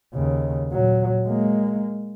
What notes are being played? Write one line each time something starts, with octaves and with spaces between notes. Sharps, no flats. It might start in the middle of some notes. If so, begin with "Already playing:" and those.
D#2 C#3
A#2 F#3
G#3 A#3